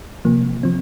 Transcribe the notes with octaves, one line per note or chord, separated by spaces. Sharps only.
C3 F3 A#3
F3 C4